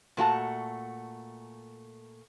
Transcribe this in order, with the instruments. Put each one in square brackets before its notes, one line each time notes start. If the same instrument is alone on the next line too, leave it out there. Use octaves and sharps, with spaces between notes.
[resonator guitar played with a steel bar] A#2 A3 F#4 A5